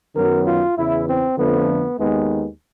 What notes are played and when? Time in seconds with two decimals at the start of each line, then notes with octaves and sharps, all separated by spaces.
0.14 F#2 D#3 F#3 B3 A#4
0.46 F4
0.76 E2 C#3 E3 E4
1.07 C4
1.37 F2 D3 F3 A3 B3
1.98 D#2 D#3 G#3 B3